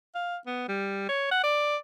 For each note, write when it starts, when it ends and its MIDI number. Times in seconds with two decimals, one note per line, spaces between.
0.15 0.36 77
0.46 0.64 59
0.68 1.06 55
1.09 1.31 73
1.31 1.40 78
1.43 1.77 74